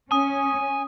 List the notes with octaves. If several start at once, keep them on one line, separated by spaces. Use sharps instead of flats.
C#4 G#5 D#6